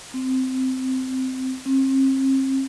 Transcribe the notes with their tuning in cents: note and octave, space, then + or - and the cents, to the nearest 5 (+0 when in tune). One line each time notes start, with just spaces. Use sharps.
C4 -10
C4 +40